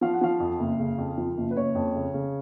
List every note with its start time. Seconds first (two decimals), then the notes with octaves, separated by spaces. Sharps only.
0.01 F3 F5
0.13 F#5
0.21 F3 F5
0.40 F2
0.59 F#1
0.79 C#3
0.98 F2
1.17 F3
1.37 F#1
1.51 B4
1.56 F#1 C#5
1.75 F2
1.95 C#3
2.14 C#3